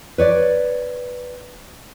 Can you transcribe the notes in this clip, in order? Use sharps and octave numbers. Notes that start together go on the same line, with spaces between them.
B4 C#5 D5